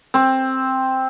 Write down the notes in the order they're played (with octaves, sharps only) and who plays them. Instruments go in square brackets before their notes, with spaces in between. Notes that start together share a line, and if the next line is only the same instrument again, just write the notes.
[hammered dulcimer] C4